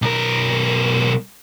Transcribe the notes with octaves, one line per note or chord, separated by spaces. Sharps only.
B1 A#4